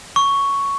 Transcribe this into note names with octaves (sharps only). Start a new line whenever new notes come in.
C#6